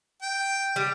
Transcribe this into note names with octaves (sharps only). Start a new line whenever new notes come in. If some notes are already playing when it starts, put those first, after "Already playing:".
G5
G3